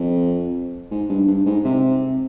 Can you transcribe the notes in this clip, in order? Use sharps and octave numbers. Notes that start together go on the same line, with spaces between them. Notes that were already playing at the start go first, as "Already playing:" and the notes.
Already playing: F2
G#2
G2
G2
G#2
C3